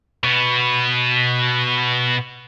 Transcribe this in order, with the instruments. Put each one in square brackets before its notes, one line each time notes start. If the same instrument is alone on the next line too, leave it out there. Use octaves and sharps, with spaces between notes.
[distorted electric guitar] B2 B3